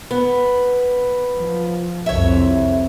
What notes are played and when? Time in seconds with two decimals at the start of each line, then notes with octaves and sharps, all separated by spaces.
0.11 B3
1.33 F3
2.06 C2 F2 C#5 E5